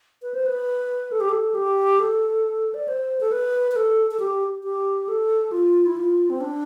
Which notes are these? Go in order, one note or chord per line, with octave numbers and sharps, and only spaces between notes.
B4
C5
B4
A4
G4
A4
G4
A4
D5
C5
A4
B4
B4
A4
A4
G4
G4
A4
F4
E4
F4
C4
D4